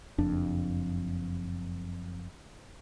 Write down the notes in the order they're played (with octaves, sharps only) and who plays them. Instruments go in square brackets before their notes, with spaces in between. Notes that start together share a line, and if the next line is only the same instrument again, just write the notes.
[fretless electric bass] F#1 F2 D4